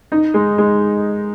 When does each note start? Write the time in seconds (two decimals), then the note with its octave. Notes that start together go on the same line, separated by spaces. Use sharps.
0.12 D#4
0.34 G#3
0.58 G#3